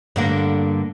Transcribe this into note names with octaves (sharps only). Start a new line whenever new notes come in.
G2 D3 A#3